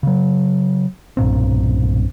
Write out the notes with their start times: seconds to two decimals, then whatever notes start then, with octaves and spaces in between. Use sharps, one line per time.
0.03 C#3 F#3
1.17 B1 G2 A#2 C4